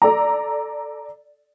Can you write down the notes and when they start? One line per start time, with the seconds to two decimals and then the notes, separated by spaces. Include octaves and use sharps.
0.02 A4 D5 A#5